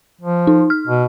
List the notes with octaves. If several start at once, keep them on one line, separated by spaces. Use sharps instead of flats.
F3
D#4
F6
B2